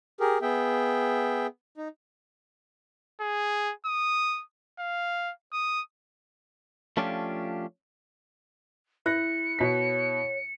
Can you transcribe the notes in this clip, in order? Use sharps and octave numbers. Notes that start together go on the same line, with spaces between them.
G4 G#4 A#4
B3 G#4 E5 G5
D#4
G#4
D#6
F5
D#6
F3 A3 C#4 D4 F4 G4
E4 F#6 A#6 C#7
B2 C#5 B6